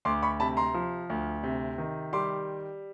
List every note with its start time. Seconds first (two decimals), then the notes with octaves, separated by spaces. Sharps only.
0.05 D2 C6 D6
0.23 B5 C#6
0.40 C3 A5 B5
0.57 A#5 C6
0.74 F3
1.10 D2
1.43 C3
1.78 D#3
2.13 G3 C6 D6